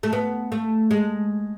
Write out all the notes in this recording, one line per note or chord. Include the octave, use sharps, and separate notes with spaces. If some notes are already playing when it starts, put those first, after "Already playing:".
A3
B3
A3
G#3